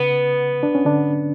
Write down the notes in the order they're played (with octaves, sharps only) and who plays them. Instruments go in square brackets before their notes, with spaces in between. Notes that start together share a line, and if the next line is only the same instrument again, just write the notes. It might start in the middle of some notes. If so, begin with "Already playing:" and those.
Already playing: [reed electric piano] C#3 [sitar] B3
[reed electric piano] D4
C#4
D3 D4